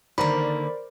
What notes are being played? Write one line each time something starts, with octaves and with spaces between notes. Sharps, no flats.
D3 D#3 A#3 A#4 C5 D5 A#5 B5